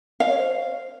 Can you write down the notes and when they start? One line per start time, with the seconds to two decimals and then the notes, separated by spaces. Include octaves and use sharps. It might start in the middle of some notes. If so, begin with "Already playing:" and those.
0.20 D#5 F5
0.29 C#5
0.38 C5